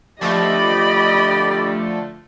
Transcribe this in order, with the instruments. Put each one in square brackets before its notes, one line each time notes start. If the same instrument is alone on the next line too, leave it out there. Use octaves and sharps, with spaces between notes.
[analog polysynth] D3 F3 A3 [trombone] G4 [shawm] D5 [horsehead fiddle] D#5 B5